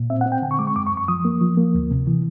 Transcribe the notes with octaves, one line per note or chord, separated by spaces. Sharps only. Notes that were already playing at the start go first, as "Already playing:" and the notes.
Already playing: A#2
C4 E5
F#5
C4
G5
D3 G#5
C#6
G#3 D6
C#6
F#2 D6
C#6
F#2
C#6
F3 D#6
A#3
F3
A#3
D2
C3
E3